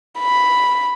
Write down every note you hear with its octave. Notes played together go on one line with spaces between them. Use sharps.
B5